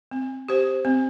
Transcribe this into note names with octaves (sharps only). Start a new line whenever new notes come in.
C4
G4 C5
C4